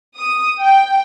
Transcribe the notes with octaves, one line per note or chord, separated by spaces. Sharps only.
D#6
G5